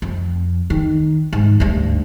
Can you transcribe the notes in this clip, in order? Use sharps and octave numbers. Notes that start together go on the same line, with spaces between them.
F2
D#3
G#2
D2 G2